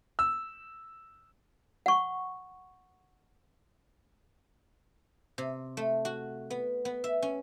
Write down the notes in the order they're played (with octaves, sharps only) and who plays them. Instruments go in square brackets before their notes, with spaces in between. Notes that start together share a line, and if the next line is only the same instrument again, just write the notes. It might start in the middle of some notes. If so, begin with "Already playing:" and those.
[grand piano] E6
[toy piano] F#5 C#6
[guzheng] C3
A3
F#4
B3
B3
E5
C#4